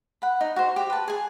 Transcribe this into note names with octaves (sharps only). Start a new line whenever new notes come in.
F#5 B5
D#4
F#4 C5
G4
B4 A5
G#4 G#5